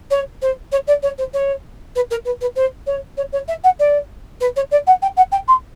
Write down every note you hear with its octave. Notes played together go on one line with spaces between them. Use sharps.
C#5
C5
C#5
D5
C#5
C5
C#5
B4
A#4
B4
B4
C5
C#5
C#5
C#5
E5
F#5
D5
B4
C#5
D5
F#5
G5
F#5
G5
C6